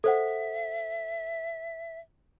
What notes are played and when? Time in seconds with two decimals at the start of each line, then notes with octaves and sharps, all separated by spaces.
0.04 A4 C5 E5 F#5